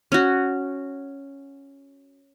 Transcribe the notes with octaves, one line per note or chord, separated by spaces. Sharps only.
C#4 F#4